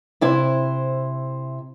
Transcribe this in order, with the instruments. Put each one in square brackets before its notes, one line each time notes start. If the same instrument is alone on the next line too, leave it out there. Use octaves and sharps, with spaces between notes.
[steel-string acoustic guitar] C3 E4 C5